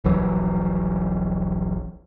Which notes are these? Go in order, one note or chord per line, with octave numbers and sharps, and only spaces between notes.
D#1 A#1 E3 F#3